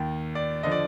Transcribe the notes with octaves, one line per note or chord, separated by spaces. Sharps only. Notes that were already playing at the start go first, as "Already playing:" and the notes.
Already playing: D#2 D#3
D5
D3 F3 D#5
D5